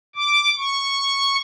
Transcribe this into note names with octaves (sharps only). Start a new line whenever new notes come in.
D6
C#6